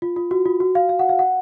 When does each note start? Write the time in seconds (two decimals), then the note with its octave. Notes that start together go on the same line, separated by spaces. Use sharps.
0.02 F4
0.16 F4
0.31 F#4
0.45 F4
0.60 F#4
0.75 F5
0.89 F5
0.99 F#5
1.09 F5
1.19 F#5